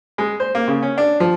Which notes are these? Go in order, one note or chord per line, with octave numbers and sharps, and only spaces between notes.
G#3
C5
A#3
C#3
C#4
D4
F3